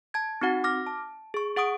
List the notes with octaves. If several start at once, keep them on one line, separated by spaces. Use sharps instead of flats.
A5 G#6
C4 D#4 F#4 F#5
D6 F6 A#6
A5
G#4 C#6
G#4 F#5 C#6 D#6 D7